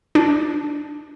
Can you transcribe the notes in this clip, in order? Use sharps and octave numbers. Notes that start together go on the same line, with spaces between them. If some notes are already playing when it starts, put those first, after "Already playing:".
D4